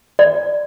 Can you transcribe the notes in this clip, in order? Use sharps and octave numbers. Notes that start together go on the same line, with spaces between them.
D5